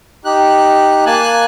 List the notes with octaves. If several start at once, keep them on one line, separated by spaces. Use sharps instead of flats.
D#4 G4 F#6
A#3 G#5 A5 F#6